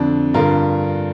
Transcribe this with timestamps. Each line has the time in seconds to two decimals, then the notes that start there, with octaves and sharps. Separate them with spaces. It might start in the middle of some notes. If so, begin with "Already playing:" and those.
Already playing: F2 D3 D4
0.34 G2 D3 F4 A#4